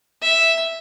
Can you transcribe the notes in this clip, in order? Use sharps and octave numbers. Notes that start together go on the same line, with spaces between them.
E5